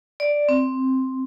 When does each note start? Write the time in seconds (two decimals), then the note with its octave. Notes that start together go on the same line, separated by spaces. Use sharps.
0.20 D5
0.49 C4